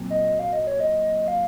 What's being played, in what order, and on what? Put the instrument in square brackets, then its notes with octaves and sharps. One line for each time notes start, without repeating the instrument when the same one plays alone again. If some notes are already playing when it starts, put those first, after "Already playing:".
Already playing: [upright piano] A#2 F#3 C4
[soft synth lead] D#5
F5
D#5
C#5
D#5
F5